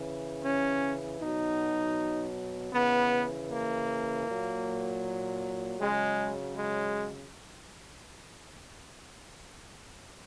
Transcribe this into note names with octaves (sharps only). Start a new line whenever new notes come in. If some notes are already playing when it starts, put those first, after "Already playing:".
Already playing: C#3 E3
C#4
B2 F#3 D#4
C#3 E3 B3
A#3
A#2 F#3
C#3 F#3 G#3
G#3